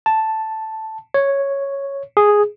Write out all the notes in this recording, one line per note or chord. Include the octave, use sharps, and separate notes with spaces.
A5
C#5
G#4